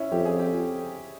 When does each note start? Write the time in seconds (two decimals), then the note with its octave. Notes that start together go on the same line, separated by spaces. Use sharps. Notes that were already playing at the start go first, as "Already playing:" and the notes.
Already playing: C#4 E4
0.12 F2 G4
0.25 G#4
0.40 G4